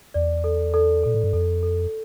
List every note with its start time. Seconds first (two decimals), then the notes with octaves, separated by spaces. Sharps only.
0.14 E2 D5
0.44 A4
0.74 A4
1.04 A#2 A4
1.15 A2
1.24 G2
1.33 F2 A4
1.63 A4